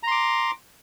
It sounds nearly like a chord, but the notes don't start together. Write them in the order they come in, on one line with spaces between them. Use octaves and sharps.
A#5 C6 D6